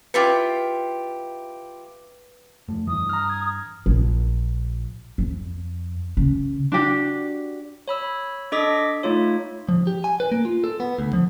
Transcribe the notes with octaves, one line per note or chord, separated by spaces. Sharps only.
E4 F4 G4 B4 C#7
F2 A3
G2 E3 D#6
A#5 F6
G#6
A#1
F2
C#3
D4 F#4 G4
C#5 B5 E6
D4 A4 D#5 D6 A#6 B6
A3 D#4 F4 C#5
F3
G4
G#5
B4
A#3
F4
A4
B3
D2
F3